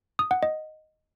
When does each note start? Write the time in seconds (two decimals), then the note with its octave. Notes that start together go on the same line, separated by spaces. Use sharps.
0.19 D#6
0.31 F#5
0.43 D#5